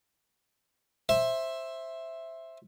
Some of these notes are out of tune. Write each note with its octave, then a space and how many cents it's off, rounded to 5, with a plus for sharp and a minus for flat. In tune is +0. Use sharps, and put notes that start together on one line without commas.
C5 +15 E5 +0